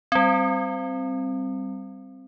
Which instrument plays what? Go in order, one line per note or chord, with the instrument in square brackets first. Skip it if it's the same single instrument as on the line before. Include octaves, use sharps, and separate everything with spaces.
[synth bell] G3 C4